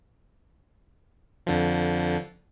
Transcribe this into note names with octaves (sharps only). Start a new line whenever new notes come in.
F2 D3 F3